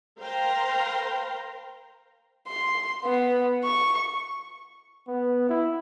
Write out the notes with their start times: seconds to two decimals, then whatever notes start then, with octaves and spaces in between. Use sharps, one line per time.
0.19 A#4 C5 F5 G5 A#5 C6
2.48 C6
3.05 B3
3.64 C#6
5.08 B3
5.49 E4